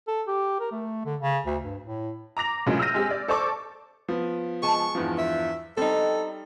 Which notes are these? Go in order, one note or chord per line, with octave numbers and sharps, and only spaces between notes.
A4
G4
A#4
A3
D3
C#3
D2
G2
A2
A#5 D6 A#6 F7
A2 C#3 F3 F#3 G#3 A#3
E6 F6 G6 A#6 D#7
G#3 C4 G4 G#4
D5
A4 C5 D5 A5 C#6 D6
F3 B3
G#3 G#5 A5 C#6
E2 G2 F3
E5
G3 C4 D#4 A4